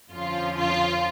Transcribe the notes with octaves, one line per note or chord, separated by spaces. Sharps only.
F2 D3 F3 C#4 F4
F4